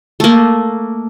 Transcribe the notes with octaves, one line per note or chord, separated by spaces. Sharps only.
A3 A#3